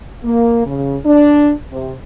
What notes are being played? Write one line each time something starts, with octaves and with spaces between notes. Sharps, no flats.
A#3
C#3
D4
C3